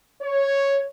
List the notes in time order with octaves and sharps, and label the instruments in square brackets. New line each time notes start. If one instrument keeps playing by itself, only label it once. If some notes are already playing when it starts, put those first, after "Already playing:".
[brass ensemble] C#5